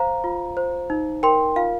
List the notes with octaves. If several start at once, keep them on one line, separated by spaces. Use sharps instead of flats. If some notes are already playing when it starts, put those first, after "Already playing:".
Already playing: C5 F5 A#5
F4
C5
D#4
A#4 G5 C6
F4 F5